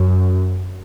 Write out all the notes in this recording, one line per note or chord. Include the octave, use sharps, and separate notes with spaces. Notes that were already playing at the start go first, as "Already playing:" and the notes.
Already playing: F#2